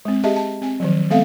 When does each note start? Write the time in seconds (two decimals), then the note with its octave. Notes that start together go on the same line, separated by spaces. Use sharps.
0.05 G#3 C4
0.24 G4 G#4 D#5 E5 A5
0.36 A5
0.62 C4 G#5
0.80 D#3 F3 F#3
1.10 G#3 B3 C4 A4 E5 F5